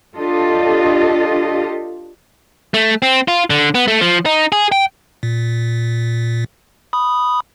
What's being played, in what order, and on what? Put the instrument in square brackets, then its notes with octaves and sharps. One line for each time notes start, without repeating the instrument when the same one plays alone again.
[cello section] D4 F4 G4 A4 D#5
[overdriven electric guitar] A3
C4
F4
D3
B3
A3
F3
D#4
G#4
G5
[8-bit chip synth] A#2
B5 D#6